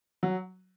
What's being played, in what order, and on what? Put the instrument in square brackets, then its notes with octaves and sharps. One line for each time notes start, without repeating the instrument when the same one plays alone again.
[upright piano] F#3